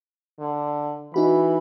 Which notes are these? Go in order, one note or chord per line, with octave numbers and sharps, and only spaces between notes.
D3
E3 D#4 F#4 B5